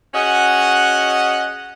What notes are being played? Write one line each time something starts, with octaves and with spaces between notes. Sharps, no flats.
C#4 F#4 G#4 D#5 F#5